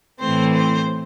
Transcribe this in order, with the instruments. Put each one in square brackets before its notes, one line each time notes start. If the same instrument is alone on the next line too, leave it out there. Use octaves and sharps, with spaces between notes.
[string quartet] A2 E3 A3 C4 C5
C5